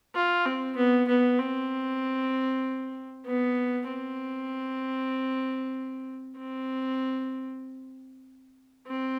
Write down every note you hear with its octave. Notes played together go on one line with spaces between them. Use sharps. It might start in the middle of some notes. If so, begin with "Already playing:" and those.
F4
C4
B3
B3
C4
B3
C4
C4
C4